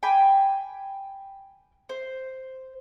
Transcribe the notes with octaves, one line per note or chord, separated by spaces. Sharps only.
G5 G#5 B5 D6
C5